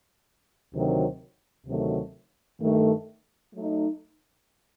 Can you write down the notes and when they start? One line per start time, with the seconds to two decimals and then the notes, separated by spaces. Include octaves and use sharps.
0.73 D2 C3 D#3 F#3 C4
1.66 D2 C3 D#3 F#3 A3
2.60 G2 D#3 A3
3.54 F#3 A3 D#4